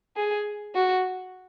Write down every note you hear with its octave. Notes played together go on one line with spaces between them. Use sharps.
G#4
F#4